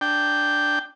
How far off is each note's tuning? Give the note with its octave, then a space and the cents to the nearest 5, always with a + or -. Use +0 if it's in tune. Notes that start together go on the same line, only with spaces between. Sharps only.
D4 +0 G5 +0